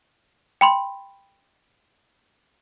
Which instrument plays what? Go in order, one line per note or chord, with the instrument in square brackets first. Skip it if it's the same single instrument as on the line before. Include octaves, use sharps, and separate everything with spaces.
[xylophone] G5 B5 C6